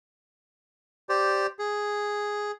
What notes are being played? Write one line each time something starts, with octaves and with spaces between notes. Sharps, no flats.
G4 C5 D5
G#4